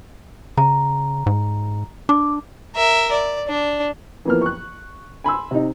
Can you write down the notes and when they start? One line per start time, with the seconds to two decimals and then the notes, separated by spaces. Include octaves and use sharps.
0.57 C#3 A#5
1.26 G#2
2.09 D4 D6
2.76 A#4 E5
3.11 D5
3.48 D4
4.25 E3 F3 A#3 B3 F6
4.42 C#6 F#6
5.24 G#5 B5 C6 E6
5.51 C3 D#4